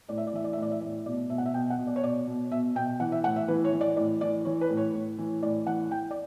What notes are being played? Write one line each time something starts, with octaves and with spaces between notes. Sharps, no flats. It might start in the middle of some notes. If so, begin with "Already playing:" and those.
A2 D5
E5
D5
E3 E5
D5
E5
A2 D5
E5
A2 D5
B2 D5
B2 E5
F#5
E5
B2 G5
F#5
B2
D5
C#5
B2 D5
B2
B2 E5
B2 G5
E3 F#5
E5
A2 F#5
E5
E3 B4
C#5
E3
D5
A2 D5
E3 D5
E3 C#5
B4
A2
C#5
A2
E3
A2 D5
E3 F#5
E3 G5
D5